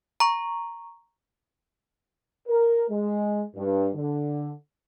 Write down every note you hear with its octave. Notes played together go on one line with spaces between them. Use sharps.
A#5 C#6
A#4
G#3
G2
D3